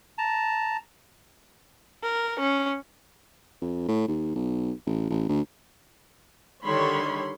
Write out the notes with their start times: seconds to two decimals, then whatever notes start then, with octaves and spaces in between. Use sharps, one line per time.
0.18 A5 A#5
2.03 A#4
2.39 C#4
3.61 F2
3.88 A2
4.08 D#2
4.36 B1
4.86 A1
5.10 A1
5.29 D2
6.64 D3 D#3 G3 C#5 B5 C6